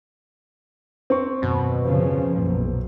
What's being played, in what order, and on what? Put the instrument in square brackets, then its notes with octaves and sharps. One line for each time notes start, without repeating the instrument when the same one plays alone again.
[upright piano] C4 C#6
[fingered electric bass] D#1 F#2 [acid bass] B2
[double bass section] C#3 F3
[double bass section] B1 [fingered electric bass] F#2 A#2